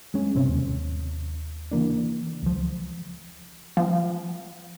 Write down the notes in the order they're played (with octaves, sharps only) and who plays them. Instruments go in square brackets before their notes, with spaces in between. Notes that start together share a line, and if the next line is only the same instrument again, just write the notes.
[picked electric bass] G#3 C#4
G1 C3 C4 C#4
D#2
C#3 E3 A#3 D4
C#2 F3
[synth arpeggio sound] F3